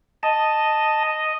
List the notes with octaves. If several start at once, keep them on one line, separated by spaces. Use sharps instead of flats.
D#5 A5